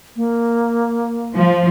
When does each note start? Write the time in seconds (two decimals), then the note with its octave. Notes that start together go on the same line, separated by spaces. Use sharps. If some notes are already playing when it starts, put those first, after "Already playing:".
0.16 A#3
1.35 F3